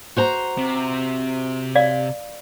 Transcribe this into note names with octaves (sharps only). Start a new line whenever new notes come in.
F#4 C5 A#5
C3
D5 F5